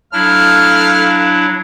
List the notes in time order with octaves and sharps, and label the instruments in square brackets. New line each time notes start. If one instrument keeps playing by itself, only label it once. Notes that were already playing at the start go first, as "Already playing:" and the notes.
[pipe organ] F#3 D4 E4 [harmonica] A3 F5 F6